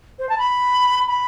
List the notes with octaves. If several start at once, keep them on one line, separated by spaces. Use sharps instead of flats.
C5
A5
B5
B5